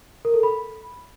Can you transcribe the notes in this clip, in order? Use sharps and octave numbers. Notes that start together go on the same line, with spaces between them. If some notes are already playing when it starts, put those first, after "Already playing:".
A#4
A4
B5